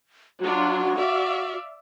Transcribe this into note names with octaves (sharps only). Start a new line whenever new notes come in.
F#3 D4 F4 F#4
D5 E5 F5